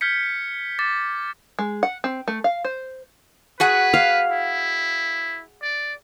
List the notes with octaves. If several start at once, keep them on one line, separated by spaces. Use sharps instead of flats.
F6 G6 G#6 B6 C#7
D6 A6
G#3
F#5
C4
A3
F5
C5
F#4 G#4 B4 F#5
F5
E4
D5